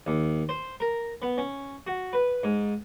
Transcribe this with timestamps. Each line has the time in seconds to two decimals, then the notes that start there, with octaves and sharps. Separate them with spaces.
0.07 D#2
0.49 C5
0.80 A#4
1.22 B3
1.38 C#4
1.87 F#4
2.13 B4
2.43 G#2